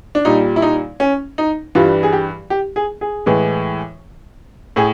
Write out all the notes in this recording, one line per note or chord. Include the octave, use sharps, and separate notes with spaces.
D4
A#2 G3 D#4
E4
D#4
C#4
D#4
G2 E3 G3 F4
G#4
G4
G4
G#4
G#4
A2 E3 G#3
A2 G#4